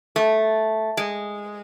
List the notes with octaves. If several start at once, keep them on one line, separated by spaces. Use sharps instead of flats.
A3
G#3